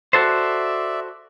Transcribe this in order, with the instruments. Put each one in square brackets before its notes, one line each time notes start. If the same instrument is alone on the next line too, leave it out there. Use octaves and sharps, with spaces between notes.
[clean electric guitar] F#4 A4 C5 [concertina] D5 E5